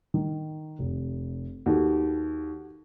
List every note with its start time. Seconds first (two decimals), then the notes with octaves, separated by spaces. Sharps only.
0.14 D#3
0.79 F1
1.66 D#2 F#4 G4 A4